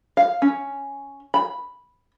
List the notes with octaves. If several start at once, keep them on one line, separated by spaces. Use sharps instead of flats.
F5
C#4
B5